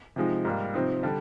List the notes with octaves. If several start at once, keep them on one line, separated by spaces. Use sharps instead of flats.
C3 F3 G#3 D#4
G#2 G3 A#3
C3 F3 C4 D#4
D3 G3 D4